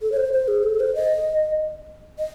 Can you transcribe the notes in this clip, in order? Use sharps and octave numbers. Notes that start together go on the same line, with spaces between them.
A4
C#5
C5
C5
G#4
A4
C5
D#5
D#5